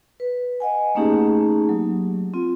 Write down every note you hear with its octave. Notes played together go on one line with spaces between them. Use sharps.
B4
D#5 F#5 G#5
A3 A#3 C#4 D#4 G4 G#4
F#3
C4 F4